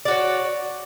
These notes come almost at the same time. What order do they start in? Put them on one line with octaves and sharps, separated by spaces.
D5 F#4 C#5